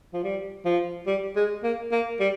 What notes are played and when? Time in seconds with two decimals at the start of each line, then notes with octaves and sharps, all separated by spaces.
0.14 F3
0.24 G3
0.65 F3
1.07 G3
1.36 G#3
1.64 A#3
1.92 A#3
2.20 G3